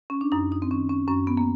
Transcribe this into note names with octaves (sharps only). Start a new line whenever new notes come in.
C#4
D4
F#2 D#4
D#4
C4
D#3 C#4
C#4
F#2 C#4
B3
A#3